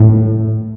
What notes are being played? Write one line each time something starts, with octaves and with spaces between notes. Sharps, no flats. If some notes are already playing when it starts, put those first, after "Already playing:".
Already playing: A2